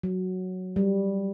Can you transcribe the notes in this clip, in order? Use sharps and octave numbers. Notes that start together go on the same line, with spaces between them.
F#3
G3